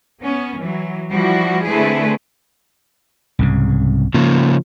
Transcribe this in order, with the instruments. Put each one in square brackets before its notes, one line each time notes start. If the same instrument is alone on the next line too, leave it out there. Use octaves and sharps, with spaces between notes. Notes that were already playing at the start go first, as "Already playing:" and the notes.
[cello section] B3 C#4
E3 F#3
F3 G3 E4 F#4
D3 A3 C4 E4 G#4 B4
[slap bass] C2 G#2 C#3
[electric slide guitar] C#3 F3 [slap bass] A#3